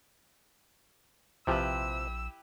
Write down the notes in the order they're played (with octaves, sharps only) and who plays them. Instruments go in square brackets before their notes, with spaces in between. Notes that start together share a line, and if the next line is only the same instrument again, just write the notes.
[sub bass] A#1 [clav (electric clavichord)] C3 F3 [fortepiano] E4 G4 B4 [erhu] E6